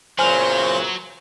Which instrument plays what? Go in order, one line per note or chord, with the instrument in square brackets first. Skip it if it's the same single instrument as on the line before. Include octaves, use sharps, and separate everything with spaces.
[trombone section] E2 A#2 C#3 [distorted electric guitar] F#3 [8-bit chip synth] C5 [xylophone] G#5 F6 F7